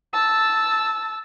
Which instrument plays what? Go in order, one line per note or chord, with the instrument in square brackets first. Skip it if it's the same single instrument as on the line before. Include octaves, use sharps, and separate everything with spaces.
[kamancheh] A5 E6